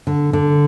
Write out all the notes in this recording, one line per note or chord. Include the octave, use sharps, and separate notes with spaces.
D3
D3